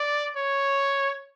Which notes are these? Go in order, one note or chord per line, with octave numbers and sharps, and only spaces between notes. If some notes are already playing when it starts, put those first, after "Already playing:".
Already playing: D5
C#5